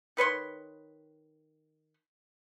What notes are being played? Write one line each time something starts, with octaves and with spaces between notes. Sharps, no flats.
D#3 B4 C#5 C6